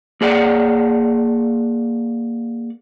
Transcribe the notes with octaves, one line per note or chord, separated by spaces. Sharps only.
A#3 G#4 D5 F#5